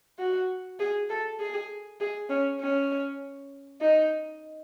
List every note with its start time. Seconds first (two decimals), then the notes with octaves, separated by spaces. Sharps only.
0.19 F#4
0.79 G#4
1.09 A4
1.39 G#4
2.00 G#4
2.29 C#4
2.60 C#4
3.81 D#4